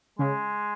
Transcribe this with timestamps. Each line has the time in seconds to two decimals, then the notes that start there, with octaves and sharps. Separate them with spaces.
0.19 C#3 G#3